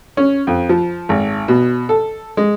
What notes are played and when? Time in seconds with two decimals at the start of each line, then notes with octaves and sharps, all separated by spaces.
0.17 C#4
0.47 F2
0.69 F3
1.09 G#1
1.48 B2
1.89 A4
2.37 G#3